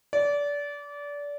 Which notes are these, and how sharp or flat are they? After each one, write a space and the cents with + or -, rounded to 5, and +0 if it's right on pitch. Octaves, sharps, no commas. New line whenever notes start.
D5 -25